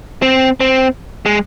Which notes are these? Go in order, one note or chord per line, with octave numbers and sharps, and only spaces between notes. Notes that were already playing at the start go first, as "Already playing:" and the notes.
C4
C4
G#3